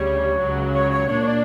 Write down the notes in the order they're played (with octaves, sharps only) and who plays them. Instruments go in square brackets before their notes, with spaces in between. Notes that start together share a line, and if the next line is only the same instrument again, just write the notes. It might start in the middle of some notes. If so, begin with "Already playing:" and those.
Already playing: [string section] D2 C#3 G3 [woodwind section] C#5
[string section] C#2 C#3 F#3
[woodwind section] C#5
C#5
[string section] A#2 A#3 D4 [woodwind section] C#5
[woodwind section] C#5
D5